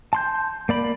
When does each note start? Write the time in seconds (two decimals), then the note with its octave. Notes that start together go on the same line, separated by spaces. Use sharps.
0.13 A5 C6 G6
0.69 A#3 D5 B5